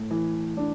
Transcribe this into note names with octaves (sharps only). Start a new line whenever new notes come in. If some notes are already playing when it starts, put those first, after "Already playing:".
Already playing: A2
E3
D4